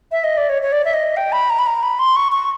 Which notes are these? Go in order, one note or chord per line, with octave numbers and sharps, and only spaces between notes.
E5
D#5
D5
C#5
C#5
D5
E5
D#5
G5
B5
A#5
B5
A#5
B5
C6
C#6
C#6